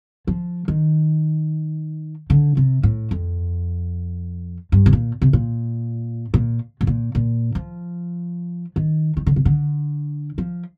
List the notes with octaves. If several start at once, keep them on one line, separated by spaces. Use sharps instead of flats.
F3
D#3
D3
C3
A2
F2
G2
C3
A#2
C3
A#2
A#2
A2
A#2
A#2
F3
D#3
D#3
D3
C3
D3
F3